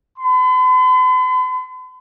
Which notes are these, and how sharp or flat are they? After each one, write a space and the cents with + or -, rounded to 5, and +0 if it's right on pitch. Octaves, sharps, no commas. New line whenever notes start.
B5 +45